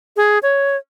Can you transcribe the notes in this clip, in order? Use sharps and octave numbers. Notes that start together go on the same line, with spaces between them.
G#4
C#5